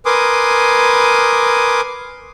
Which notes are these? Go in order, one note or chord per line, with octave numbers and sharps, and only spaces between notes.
A#4 B4 G#5 C6 D6 D#6